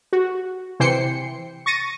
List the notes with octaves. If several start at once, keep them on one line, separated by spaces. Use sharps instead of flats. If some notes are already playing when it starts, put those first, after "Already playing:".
F#4
C3 E3 C5 G5 C7 C#7
C#6 A6 A#6 C#7 D#7